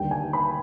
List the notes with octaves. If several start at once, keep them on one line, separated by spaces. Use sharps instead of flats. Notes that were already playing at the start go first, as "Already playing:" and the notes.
Already playing: D#2 D3 G3 G5
G#5
B5